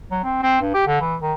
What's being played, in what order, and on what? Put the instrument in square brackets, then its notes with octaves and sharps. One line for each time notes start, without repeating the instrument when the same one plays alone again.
[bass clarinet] F#3
C4
C4
G2
G4
D3
E3
D#3